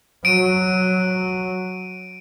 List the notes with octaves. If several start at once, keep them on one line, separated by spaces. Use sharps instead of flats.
F#3 D7 D#7